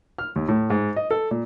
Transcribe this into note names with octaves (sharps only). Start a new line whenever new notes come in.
F6
D#2
A2
G#2
D#5
A4
A#2